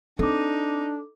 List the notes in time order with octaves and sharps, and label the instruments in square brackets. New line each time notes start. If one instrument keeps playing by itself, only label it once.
[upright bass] C4 [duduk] D4 [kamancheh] D#4 [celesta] A4 D6